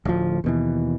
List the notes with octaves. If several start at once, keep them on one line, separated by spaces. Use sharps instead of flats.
D1 D2 F3
D#2 B2 E3